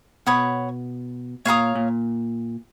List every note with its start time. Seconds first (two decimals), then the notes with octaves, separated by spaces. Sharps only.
0.26 B2 C#5 F#5 B5 D#6
1.45 A#2 C#5 F5 A#5 D#6
1.75 A#2